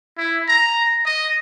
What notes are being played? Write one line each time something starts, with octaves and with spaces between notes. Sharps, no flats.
E4
A#5
D#5